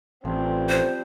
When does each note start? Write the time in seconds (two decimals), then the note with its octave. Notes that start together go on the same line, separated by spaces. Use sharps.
0.25 A1 F3 G3 C4
0.69 C5